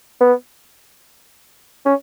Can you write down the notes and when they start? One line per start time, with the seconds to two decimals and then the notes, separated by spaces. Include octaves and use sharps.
0.21 B3
1.85 C#4